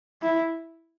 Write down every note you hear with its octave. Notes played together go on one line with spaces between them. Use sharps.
E4